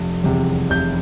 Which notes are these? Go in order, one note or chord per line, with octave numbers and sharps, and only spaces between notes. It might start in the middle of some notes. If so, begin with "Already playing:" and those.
Already playing: F1
E2 C3
F1 G6